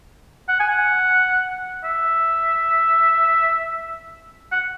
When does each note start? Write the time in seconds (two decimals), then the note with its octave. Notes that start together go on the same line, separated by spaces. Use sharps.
0.49 F#5
0.60 G#5
0.70 F#5
1.84 E5
4.52 F#5